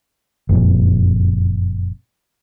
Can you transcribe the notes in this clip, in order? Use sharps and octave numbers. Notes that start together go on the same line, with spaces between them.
F#1 F2 A#2